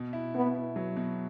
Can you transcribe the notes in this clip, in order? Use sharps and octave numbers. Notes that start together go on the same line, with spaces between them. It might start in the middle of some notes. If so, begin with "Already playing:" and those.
Already playing: B2
E4
B2 B3
E4
F#3
B2